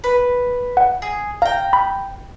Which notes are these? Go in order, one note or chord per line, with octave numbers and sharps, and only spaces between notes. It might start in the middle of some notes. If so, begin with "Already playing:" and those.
B4
F#5
G#4
F5 G5 A#5
B5